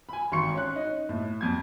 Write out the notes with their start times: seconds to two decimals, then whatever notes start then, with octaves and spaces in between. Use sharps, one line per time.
0.09 G#5 B5
0.32 G#1 C6 C#6 C#7
0.55 C#4 F#6
0.76 D#4
1.09 A2
1.41 F2 G#6